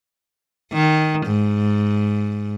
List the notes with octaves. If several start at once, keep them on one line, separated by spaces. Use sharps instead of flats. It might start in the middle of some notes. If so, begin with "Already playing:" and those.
D#3
G#2